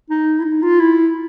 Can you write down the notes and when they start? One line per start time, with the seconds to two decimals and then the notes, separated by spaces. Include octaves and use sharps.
0.10 D#4
0.40 E4
0.45 D#4
0.62 F4
0.80 E4